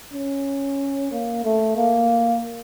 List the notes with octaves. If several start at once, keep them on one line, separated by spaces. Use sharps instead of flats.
C#4
A#3
A3
A#3